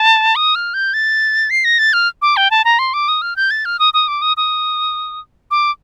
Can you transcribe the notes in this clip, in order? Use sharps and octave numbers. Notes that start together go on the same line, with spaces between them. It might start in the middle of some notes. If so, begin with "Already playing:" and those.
Already playing: A5
D#6
F6
G6
A6
C7
A#6
A6
F6
D6
G5
A5
A#5
C6
D6
D#6
F6
G6
A6
F6
D#6
D#6
D6
D#6
D#6
D6